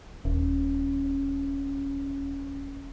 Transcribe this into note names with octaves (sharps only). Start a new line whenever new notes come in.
D#1 C#4